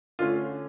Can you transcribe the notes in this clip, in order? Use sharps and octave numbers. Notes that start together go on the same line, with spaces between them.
D3 A3 C#4 F4